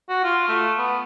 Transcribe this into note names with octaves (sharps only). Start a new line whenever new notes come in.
F#4
F4
A3
B3